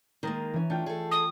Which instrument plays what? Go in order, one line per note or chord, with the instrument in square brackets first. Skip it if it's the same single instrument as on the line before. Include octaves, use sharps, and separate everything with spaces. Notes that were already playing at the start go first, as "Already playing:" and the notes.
[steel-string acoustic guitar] D#3 G#3 A#3 [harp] A#5 D#6 A6
[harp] E3 C#4
[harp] A3 F4 G5 [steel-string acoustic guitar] D4
[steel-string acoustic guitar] G#4 A4
[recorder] D#6